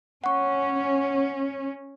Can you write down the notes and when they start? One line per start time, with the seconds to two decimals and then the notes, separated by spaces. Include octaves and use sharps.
0.24 C#4 F#5 C#6